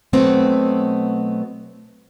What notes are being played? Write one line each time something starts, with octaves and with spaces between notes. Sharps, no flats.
B2 F#3 A3 B3 C4